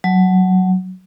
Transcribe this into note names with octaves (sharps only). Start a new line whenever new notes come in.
F#3